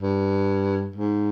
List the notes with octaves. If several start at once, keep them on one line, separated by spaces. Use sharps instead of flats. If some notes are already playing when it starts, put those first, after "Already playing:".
G2
G#2